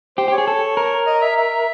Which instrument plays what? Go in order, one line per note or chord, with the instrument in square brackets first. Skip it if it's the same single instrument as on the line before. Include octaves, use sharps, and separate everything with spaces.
[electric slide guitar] G4 [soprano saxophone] C5
[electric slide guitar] G4 [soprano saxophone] C#5
[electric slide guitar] G#4
A4
A#4
[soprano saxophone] D#5
E5
E5